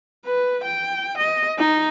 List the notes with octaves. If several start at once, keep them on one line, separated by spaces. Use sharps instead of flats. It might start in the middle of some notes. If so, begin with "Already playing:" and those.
B4
G5
D#5
D#4